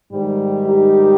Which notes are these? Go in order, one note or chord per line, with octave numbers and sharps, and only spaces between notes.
G#2 D#3 G3
D#4 G4